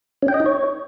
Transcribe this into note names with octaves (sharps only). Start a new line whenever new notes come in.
C#4
G5
D#5
D#4
C#5